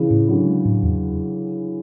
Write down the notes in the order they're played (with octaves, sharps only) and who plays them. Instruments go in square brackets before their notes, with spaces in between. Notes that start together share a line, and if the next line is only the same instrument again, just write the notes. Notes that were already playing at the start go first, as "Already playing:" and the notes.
Already playing: [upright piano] C#3 E3
[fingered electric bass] A2
[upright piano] D3 F#3 [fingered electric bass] C#4
[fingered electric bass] G#3
A2
E2